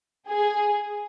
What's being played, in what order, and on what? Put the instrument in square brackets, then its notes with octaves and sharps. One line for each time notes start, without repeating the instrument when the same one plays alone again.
[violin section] G#4